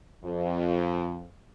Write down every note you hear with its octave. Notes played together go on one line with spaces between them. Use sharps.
F2